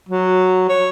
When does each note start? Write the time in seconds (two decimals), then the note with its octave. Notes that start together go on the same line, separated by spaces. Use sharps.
0.09 F#3
0.69 C#5